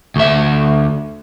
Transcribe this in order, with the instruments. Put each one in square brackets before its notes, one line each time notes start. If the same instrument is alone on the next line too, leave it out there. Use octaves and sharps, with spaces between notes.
[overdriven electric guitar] D2 E5